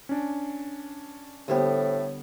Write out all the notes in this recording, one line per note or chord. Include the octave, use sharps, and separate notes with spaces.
C#4 D4
A2 D3 G3 B3 G4 C5 G5